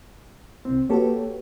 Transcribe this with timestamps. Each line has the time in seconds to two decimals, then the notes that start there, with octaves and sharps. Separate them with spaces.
0.65 C2 C4
0.89 A#3 F#4 G4 A4 B4 C#5